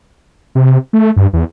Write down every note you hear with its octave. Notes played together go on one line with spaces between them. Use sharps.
C3
A3
G2
E2